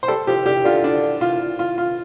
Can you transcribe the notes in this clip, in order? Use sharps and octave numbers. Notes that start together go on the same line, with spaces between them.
C5
G3 A4
F3 G4
D3 G4
D3 F4
D4
F4
F4
F4